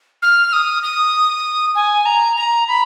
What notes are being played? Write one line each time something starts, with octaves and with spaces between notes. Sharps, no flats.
F6
D#6
D#6
G#5
A#5
A#5
B5